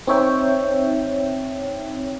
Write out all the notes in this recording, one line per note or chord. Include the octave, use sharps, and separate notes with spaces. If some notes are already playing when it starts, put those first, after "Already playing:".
C4 D#4 C#5 E5 G5